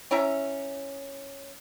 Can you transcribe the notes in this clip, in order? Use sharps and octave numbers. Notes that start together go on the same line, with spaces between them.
C#4 E4 E5 A#5